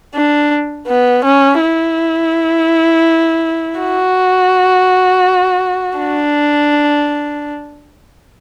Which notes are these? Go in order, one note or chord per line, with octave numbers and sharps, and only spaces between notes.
D4
B3
C#4
E4
F#4
D4